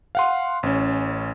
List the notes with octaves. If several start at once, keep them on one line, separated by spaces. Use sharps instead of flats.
F5 F#5 C6
A1 C#4